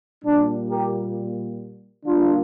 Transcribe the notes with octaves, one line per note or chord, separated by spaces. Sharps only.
A#2 G3 A#3 D4
G4 A#4
D3 G3 A#3 D4 F4